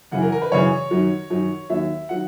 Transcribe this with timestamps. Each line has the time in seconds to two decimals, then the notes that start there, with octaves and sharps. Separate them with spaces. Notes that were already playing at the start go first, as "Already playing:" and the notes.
0.12 F#2 C#3 E3 F#5
0.22 A#4
0.32 A#4
0.42 B4
0.51 F#2 C#3 E3 C#5
0.91 F#2 D#3 F#3
1.30 F#2 D#3 F#3
1.70 D#2 D#3 F#3 E5
2.09 D#3 F#3 F#5